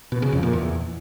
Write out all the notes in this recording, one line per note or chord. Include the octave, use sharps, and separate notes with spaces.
B2
C#3
F2
A#2
E2